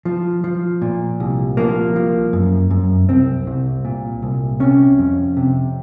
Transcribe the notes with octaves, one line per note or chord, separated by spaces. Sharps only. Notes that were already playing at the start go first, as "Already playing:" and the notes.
F3
F3
A#2
C2
F3 A#3
F3
F#2
F#2
C2 C4
C2
A#2
C2
C3 C#4
F2
C3